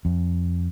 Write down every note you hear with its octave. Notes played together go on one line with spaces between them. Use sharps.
F2